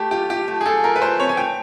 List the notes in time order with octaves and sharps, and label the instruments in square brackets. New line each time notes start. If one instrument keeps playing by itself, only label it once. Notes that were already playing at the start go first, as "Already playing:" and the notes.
Already playing: [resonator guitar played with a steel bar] A3 [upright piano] G4
[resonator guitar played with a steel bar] F4 [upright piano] G4
[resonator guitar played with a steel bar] F4 [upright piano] G4
[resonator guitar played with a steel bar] A3
[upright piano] G#4
[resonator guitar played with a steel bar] F4 [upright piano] A4
[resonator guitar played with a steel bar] F4 [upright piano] A#4
[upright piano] B4
[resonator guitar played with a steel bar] A3 [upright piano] C5
[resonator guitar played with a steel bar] C4 [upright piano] C#5
[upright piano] G#5
[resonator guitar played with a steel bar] A3 [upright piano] G5